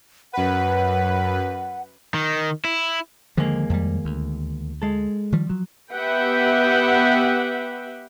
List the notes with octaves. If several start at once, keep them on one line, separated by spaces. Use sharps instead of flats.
F#2 B4 F#5
D#3
E4
D#2 D3 F3 G#3 A#3
F2 G3
D2
G#3 A4
D#3 F3 G3
F3 F#3
B3 G4 B4 E5 F#5 G5